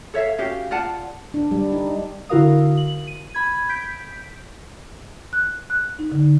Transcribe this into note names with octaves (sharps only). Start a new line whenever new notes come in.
A4 C#5 E5 F5
C#4 F#4 G4 F5
F4 D5 F#5 A5
D4
G3
D#4
D3 E4 F#4 A#4 F5 D#6
F#7
D#7
B5 G#6
G6 B6 D7
F#6
F#6
D#4
D3